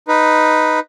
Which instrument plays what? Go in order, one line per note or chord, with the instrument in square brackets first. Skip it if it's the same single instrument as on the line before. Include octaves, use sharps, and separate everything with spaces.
[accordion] D#4 B4